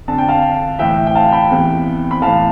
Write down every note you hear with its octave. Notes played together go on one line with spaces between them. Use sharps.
F2 D3 A5
G5
F5 A5
A2 E3 E5 G5
G5
F5 A5
G5 B5
E2 C3 E3
B5
A2 E3 F5 A5